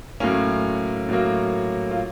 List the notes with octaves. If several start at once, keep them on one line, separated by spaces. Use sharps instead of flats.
A2 F#3 A#3 C#4
A2 F#3 A#3
F4